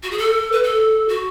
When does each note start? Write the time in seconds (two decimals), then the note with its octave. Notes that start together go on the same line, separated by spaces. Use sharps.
0.03 F#4
0.11 G#4
0.18 A4
0.52 B4
0.63 A4
1.08 F#4